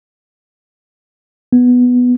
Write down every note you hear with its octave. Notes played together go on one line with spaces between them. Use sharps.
B3